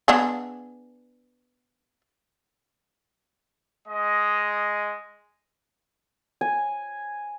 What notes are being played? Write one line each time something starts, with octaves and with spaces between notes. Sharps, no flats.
B3 D4 G#4
G#3 D#5
G#5